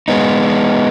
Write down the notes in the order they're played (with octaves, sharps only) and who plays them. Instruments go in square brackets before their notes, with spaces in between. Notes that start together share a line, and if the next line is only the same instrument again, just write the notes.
[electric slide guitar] G#3 B3 D#4